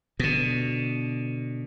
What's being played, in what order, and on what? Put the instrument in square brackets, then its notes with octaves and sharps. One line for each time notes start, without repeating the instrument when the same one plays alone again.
[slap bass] B2 D3